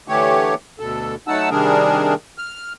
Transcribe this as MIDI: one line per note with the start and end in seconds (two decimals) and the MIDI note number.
0.08 0.54 50
0.08 0.54 52
0.08 0.54 57
0.08 0.54 67
0.08 0.54 73
0.80 1.15 38
0.80 1.15 47
0.80 1.15 69
1.28 1.49 54
1.28 1.49 57
1.28 1.49 63
1.28 1.49 78
1.28 1.49 81
1.28 1.49 88
1.50 2.14 48
1.50 2.14 51
1.50 2.14 55
1.50 2.14 62
1.50 2.14 68
1.50 2.14 70
2.38 2.73 89